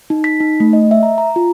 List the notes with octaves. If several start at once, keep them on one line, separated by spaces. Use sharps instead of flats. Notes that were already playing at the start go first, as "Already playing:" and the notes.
D#4
B6
D#4
A3
D#5
E5
A#5
A#5
F4